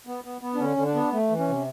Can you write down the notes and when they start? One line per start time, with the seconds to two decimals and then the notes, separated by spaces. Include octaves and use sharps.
0.07 B3
0.24 B3
0.41 B3
0.55 D4
0.60 D3 C#4
0.77 D3
0.86 D4
0.95 B3
1.13 A3
1.30 E3
1.39 C#4
1.48 C3